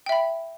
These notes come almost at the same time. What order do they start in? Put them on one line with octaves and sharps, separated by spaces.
G5 E5 B5